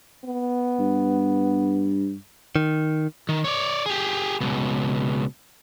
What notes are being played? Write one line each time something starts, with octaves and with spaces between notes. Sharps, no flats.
B3
G2
D#3
D#3
C#5 D5
G4 G#4
C#2 B2